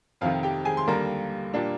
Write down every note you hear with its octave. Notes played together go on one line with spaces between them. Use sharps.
F2 C3 D#3 F4 F5
G4 G5
G#4 G#5
C6
D#2 D3 G3 A#3 A#4 A#5
A#2 G3 A#3 D4